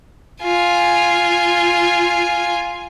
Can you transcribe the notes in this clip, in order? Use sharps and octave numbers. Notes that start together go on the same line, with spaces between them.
F4 G#5